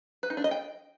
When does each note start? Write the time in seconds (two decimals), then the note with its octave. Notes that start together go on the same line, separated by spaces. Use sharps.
0.23 B4
0.30 D#4
0.37 D4
0.44 D#5
0.51 G5